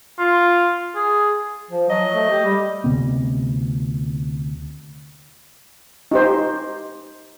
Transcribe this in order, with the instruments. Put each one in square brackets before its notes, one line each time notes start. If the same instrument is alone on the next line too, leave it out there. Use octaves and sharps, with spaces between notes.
[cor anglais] F4
G#4
[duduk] F3
[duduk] F#3 [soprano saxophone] D#5
[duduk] A3
G4
G3
[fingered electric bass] D2 C3 B3 C4
[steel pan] D#4 G4 C5